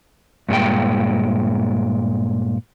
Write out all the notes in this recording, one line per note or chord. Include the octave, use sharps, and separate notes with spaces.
G2 A#2 G#3 G5